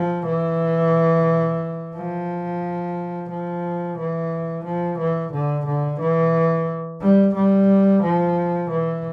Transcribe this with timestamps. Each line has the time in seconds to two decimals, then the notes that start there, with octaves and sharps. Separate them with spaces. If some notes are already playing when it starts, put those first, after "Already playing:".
Already playing: F3
0.26 E3
1.96 F3
3.30 F3
3.98 E3
4.65 F3
4.99 E3
5.32 D3
5.66 D3
6.00 E3
7.01 G3
7.35 G3
8.03 F3
8.71 E3